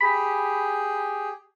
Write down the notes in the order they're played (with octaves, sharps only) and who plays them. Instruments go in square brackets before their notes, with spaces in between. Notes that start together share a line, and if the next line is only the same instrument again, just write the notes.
[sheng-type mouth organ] G4 G#4 [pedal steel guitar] B5